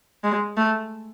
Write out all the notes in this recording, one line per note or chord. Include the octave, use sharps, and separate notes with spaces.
G#3
A3